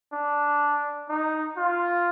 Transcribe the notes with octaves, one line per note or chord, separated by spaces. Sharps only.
D4
D#4
F4